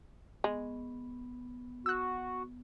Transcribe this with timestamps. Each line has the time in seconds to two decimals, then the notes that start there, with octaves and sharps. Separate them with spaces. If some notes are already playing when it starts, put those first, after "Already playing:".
0.44 G#3 B3
1.86 F#4 E6 F#6